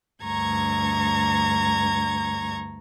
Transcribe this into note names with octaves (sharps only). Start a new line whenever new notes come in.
D2 G2 A#5 C#6 G#6